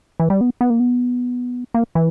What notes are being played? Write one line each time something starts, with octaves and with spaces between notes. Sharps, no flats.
E3
G3
B3
B3
A#3
B3
A#3
E3